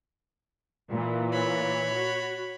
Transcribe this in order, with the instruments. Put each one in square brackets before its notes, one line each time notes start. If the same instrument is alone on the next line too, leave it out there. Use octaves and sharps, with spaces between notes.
[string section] A#2 E3
[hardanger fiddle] C#5 B5
[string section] F#4